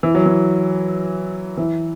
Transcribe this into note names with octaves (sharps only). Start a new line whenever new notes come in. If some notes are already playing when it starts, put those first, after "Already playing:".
E3
F#3
E3
E3